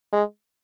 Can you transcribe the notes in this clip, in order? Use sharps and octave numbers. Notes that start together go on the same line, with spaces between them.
G#3